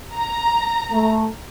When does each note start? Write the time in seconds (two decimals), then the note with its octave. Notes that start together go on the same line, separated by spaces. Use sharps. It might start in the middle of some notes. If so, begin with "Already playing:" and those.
0.15 A#5
0.90 A3